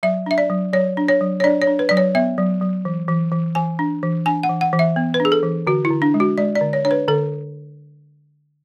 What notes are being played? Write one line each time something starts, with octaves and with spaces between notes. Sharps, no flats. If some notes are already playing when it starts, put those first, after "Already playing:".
F#3 E5
D4 E5
D5
F#3
F#3 C#5
D4
C#5
F#3
C#5
D4 D5
C#5
D4
B4
F#3 D5
C#5
B3 E5
F#3
F#3
E3
E3
E3
E3 G#5
D4
E3
D4 G#5
F#5
E3
F#5
E3
E5
B3
B4
D4
G#4
A4
E3
D3 F#4
E4
D3
D4
G#3
F#4
G#3 D5
D5
D3
C#5
D4 C#5
B4
D3 A4